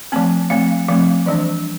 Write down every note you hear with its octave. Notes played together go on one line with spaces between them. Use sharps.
F3 A3 C4 A5
F3 A3 C4 F5
F3 A3 C4 F5
E3 G3 D4 D5